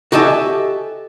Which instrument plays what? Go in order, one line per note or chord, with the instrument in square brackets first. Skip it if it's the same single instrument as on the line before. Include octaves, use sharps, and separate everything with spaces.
[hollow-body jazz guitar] F#4 G4 A4 D#5 E5 G#5